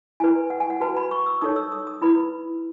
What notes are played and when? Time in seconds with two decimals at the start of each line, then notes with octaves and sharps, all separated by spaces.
0.20 E4 B4 G#5
0.50 F#5
0.60 G#5
0.70 F#5
0.81 F#4 B4 A5
0.97 B5
1.11 C#6
1.26 E6
1.41 D#4 A4 C#5 D#6
1.56 E6
1.72 D#6
1.87 D#6
2.02 E4 B4 B5